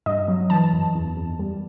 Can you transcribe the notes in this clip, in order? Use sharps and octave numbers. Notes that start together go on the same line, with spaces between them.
G2 D#5
F#3
E3 A5
F#2
E2
E2
G3